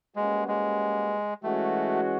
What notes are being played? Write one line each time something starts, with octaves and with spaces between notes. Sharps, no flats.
G3 G#3 A#3 C#4 F#4 B4
G#3
E3 G#3 A3 C#4 F#4